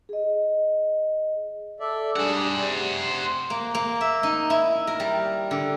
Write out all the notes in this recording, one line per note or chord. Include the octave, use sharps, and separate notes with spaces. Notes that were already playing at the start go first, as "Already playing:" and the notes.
G#4 D#5
A4 D5 E5
G3 D4 G#4 C5 F#5
C3
A#3
A#3
E5
D#4
E4
A#4
G3
D3